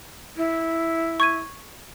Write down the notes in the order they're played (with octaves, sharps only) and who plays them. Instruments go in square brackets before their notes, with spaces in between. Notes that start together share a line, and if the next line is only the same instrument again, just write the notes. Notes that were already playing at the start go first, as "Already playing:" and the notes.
[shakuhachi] E4
[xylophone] C#6 G#6 D#7